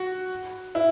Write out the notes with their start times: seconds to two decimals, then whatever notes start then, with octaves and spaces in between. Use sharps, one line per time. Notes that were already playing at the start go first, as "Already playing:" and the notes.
Already playing: F#4
0.75 E4